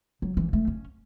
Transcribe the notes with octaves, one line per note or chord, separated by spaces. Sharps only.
F#3
E3
A3
C#4